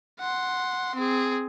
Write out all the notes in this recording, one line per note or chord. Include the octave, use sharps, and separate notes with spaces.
F#5 C6
C4 G#4